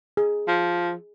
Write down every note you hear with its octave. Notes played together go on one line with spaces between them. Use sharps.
G#4
F3